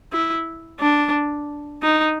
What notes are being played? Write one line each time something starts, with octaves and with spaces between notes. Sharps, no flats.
E4
D4
D#4